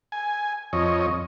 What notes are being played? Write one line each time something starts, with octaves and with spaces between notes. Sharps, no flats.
G#5
F2 C#5 D#5